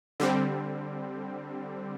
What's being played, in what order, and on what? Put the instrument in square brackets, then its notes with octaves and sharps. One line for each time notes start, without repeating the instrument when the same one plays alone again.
[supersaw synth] D3 G3 C4